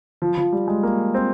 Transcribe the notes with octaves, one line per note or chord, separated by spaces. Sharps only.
F3
F3
G3
G#3
A#3
C4